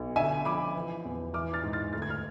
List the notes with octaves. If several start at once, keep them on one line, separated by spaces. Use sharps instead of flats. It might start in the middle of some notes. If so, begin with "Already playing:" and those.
Already playing: B1
D3 E5 G#5
F3 B5 D6
E3
E2
E3 D6 F6
F6 A6
G#2
F6 A6
D2 A6
G#6
F6